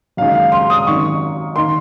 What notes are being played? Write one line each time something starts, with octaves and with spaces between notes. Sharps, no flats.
F#1 F#2 D#3 G#3 F5
F5
C6
D#6
G#1 F#2 D#3 C#6
D#3 A#3 C6